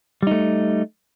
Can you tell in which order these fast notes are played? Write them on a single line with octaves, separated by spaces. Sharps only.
G3 D#4 A3